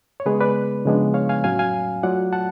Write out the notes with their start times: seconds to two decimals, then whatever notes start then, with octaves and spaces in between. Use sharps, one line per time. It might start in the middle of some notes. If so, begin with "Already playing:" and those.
0.20 C#5
0.26 C#3 G#3 B3 G#4 B4
0.40 B4 D5
0.85 C#3 F3 G#3 B3 D4
1.14 C#5 F5
1.29 F5 G#5
1.44 A2 F#3 C#4 F5 G#5
1.59 F5 G#5
2.03 F#3 A3 F4 D5 F#5
2.33 F#5 A5